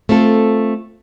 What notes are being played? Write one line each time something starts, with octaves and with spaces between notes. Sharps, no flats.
A3 C4 F4 A4